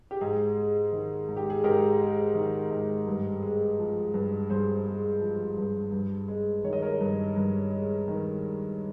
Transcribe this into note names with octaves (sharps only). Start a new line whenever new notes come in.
G4
G#2 G#4
G#3
D#3
G#2
G4
G#4
G#2 G4 A#4
G#3
D#3
G#2
G2
G#3
F3
G2
G2 G#4 C5
G#3
F3
G2
G2
G#3
D#3 C#5
D#5
A#4 C#5
G2
G2
G#3
D#3